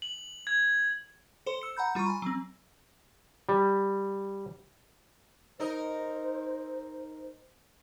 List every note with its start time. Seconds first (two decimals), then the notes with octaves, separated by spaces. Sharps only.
0.02 F#7
0.47 G#6
1.46 A4 C5 C6
1.61 E6 C#7
1.77 F#5 A#5 B5 G6
1.95 G3 F4 A#5 C6 C#6
2.07 G#5 B5
2.22 F#3 C4
3.49 G3
5.60 D#4 A#4 C5 D#5